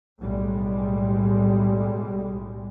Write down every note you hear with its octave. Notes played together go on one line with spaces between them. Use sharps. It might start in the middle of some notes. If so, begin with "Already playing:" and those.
B1 A2 G3 G#3